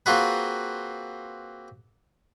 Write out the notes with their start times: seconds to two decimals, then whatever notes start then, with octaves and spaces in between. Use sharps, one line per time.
0.06 A#3 C4 F4 F#4 G#4 B4